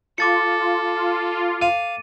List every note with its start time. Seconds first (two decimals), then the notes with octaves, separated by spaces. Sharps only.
0.18 F4 A4 D6 A6 C#7
1.61 F5 D#7